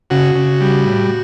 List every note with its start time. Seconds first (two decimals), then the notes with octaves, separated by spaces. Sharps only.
0.10 C#3 F#4
0.36 C#3
0.61 G3
0.86 A2